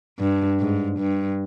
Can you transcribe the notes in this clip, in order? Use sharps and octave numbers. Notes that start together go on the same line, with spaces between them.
G2
G#2
G2